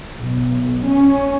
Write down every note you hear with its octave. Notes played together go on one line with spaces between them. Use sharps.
B1
C#4